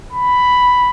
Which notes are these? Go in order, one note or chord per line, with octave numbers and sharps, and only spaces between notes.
B5